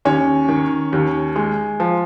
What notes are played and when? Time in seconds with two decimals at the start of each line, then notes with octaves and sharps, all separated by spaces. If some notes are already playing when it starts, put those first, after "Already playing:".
0.05 D#2 C#4
0.49 D#3
0.93 D#2
1.36 G#3
1.80 F3